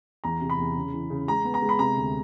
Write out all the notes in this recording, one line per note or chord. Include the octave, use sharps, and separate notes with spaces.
E2 A#5
C3
B5
E2
C#3
E3
C#3
G#3 A#5
B3
A#5
G#3
B5
C3 A#5
D2